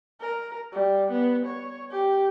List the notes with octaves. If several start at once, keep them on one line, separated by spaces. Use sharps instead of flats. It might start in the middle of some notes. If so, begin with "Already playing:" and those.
A#4
G3
B3
C#5
G4